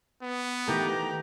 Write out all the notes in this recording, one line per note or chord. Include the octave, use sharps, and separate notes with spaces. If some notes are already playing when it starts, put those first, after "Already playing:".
B3
D#3 E3 A3 G4 A#5